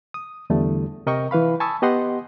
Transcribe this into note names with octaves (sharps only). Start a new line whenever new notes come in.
D#6
E2 D3 G3 A3
C3 A#4 D#5 G5 C#6
E3 B4 F5 B5
G#5 A5 B5 C#6 D#6 E6
B3 G4 D#5 F#5 C6